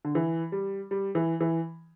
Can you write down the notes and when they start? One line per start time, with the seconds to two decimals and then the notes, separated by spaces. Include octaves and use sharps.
0.05 D3
0.15 E3
0.52 G3
0.91 G3
1.15 E3
1.41 E3